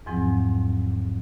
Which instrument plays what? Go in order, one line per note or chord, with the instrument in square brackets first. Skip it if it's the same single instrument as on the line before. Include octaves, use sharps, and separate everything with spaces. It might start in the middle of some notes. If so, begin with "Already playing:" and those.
[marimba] E2 G#2 F3 F#3 C4